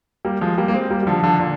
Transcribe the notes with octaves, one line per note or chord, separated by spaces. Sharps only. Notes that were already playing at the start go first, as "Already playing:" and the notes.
G3 A#3
F3 G#3
G3 A#3
A#3
G#3 C4
G3 A#3
G3
D3 F3
D3 F3
A#2 D3